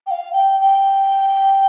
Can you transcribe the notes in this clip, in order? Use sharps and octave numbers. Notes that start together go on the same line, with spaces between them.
G5
F5
G5
G5